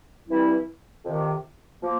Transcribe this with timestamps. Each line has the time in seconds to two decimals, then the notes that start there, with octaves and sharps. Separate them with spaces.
0.28 G2 E3 G3 C4 E4
1.05 F2 C3 D#3
1.82 F3 A#3